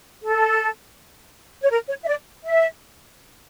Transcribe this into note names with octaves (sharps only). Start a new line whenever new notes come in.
A4
C#5
A#4
C#5
E5
D5
E5